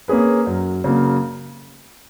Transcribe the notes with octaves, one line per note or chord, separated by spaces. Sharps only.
A#3 C#4 G#4 B4
F#2
C#3 F#3 A#3